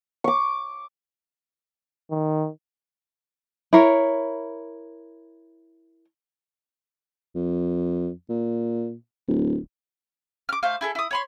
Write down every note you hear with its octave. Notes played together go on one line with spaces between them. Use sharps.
C#6 D6
D#3
E4 A#4 C#5
F2
A#2
D1
D6 F6
A3 C5 F5
E4 G#4 A4
E4 D#6
C#5 B5 C6